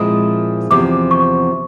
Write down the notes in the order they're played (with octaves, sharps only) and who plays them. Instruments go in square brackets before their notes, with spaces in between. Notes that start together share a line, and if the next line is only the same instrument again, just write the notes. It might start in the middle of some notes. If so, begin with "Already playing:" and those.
Already playing: [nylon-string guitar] A#2 F3 G#3 C4 E4 [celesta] D#6
[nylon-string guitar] E2 C3 F3 [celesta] D6
[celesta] C#6